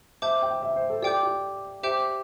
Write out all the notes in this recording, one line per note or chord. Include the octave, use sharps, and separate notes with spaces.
C5 E5 A5 D6 G6
G5
E5
C5
A4
G4 D5 G5 D6 G6
G4
G4 C5 E5 G5 D6 G6